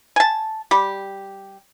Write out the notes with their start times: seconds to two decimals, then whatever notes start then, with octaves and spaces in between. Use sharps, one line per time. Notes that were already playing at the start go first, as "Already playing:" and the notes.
0.16 G#5 A5
0.71 G3 G4